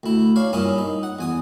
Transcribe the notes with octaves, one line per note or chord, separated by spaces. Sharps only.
D2 E4
D4 C#5 F5
G2 A#2 C#4 E4 D#6
D#4
F#5
E2 G#5 D#6